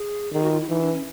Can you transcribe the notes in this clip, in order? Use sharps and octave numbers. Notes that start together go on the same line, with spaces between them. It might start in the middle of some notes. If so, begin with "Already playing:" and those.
Already playing: G#4
D#3 G#4
F#4
F4
E4
E3 D#4
D4
C#4